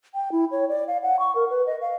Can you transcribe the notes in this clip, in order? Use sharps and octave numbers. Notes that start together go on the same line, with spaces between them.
G5
E4
C#5
D5
F5
F#5
C#6
A#4
B4
D#5
F5